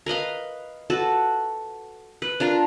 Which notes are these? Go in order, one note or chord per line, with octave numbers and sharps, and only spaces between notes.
A#4 B4 D#5 F5
F#4 A4 B4
B4
D4 F4 A#4